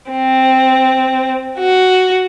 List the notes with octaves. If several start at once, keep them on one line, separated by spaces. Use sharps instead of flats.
C4
F#4